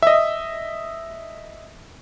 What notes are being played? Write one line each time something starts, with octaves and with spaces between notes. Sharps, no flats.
D#5 E5